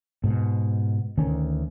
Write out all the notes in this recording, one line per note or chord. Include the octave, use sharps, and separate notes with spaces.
G#2 B2
D2 D#3 C#4